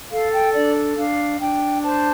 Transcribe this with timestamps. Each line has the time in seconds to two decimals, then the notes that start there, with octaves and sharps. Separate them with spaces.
0.11 A4 F5
0.33 G5
0.54 D4 D5
0.97 D4 F5
1.40 D4 G5
1.83 C5 A5